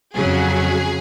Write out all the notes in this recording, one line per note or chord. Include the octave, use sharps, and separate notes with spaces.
F2 C#3 F#3 G#4